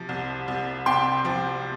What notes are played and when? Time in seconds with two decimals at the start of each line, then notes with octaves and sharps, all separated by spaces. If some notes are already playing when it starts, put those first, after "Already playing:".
Already playing: C3 F3
0.09 C2
0.48 C2
0.86 C3 G5 C6
1.25 F3